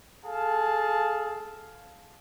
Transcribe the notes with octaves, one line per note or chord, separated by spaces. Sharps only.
G#4 A4 F5 A5